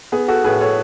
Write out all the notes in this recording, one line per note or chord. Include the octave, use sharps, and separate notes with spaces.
B3 G#4
F#4 A4
A2 G#4 B4
A4 C#5